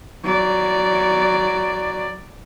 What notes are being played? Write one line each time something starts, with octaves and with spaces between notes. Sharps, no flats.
F#3 D5